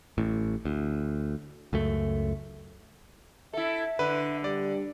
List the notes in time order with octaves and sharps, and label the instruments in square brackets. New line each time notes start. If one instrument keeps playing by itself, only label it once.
[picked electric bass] A1 A2
D2
C#2 F#2 A3
[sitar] E4 A4 [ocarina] E5
[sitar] D3 [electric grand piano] B4
[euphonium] G3 [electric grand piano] D5